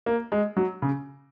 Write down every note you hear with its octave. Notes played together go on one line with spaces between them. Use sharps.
A#3
G#3
F#3
C#3